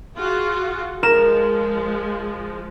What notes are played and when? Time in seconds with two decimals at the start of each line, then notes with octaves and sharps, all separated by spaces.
0.16 F4 F#4 G#4
1.03 F3 G#3 A#4 E7